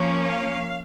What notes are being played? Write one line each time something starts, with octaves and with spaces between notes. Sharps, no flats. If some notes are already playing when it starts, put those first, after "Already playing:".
Already playing: F3 A#3 C#4
F5